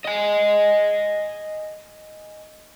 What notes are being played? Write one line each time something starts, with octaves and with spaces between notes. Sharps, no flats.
D#5 G#5